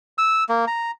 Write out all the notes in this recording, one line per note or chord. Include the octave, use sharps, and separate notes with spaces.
E6
A#3
A#5